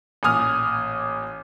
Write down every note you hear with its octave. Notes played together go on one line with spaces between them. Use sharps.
A1 A#2 G#5 D#6 F6